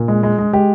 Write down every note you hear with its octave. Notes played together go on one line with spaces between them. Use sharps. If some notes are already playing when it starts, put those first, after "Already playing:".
Already playing: A#2
G#3
G#3
G#3
G#3 G4